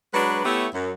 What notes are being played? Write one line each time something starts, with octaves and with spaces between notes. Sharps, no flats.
F#3 G#3 D4 F#4 B4
A3 B3 E4 G4 C#5 E5
F#2